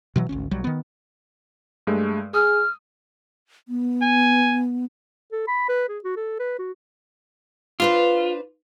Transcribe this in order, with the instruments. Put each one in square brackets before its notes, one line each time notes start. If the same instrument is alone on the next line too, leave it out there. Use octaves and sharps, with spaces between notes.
[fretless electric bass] B2 E3 F#3
G#1 D2 C#4
B1 F#3 G3
D#3 B3
[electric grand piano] G2 G#3 A3
[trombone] G#4 [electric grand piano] D#6 [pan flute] F6
[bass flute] B3
[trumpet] G#5
[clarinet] A4
B5
B4
G#4
F#4
A4
B4
F#4
[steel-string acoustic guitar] D4 B4 C5 [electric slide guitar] F4